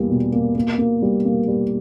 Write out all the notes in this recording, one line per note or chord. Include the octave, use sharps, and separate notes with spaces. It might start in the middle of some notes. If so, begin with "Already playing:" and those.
Already playing: E2 G3 A#3
B2
A#3
A#3
A#3
G3
A#3
G3